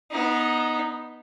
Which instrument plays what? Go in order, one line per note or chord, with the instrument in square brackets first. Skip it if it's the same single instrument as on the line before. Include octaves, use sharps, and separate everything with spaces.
[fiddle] B3 D#4